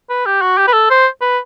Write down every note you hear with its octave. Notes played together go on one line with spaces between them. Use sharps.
B4
G4
F#4
G4
B4
A4
C5
B4